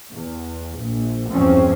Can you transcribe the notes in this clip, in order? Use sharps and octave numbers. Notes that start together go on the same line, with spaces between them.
E2
A#1
E2 G2 F3 C4 C#4